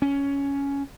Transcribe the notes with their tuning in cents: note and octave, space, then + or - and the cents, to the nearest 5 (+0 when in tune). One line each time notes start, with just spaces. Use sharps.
C#4 +10